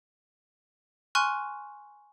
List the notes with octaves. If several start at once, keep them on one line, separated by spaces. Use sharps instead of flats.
G#5 C6 C#6 F6 F#6